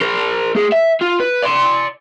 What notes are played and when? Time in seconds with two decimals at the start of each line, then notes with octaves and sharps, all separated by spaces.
0.01 A#4 C5
0.55 A3 G#4
0.72 E5
1.01 F4
1.20 B4
1.42 D5 C6